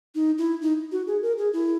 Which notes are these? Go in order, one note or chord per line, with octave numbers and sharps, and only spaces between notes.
D#4
E4
D#4
F#4
G#4
A#4
G#4
E4